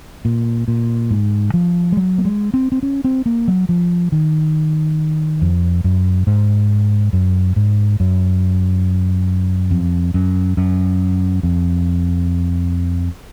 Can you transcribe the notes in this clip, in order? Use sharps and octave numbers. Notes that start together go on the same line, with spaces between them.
A#2
A#2
G#2
F3
G#3
F#3
A#3
G#3
C4
C4
C#4
C4
A#3
F#3
F3
D#3
F2
F#2
G#2
F#2
G#2
F#2
F2
F#2
F#2
F2